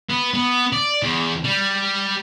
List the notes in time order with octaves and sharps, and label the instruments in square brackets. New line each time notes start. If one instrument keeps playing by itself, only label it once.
[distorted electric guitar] B3
B3
D5
E2
G3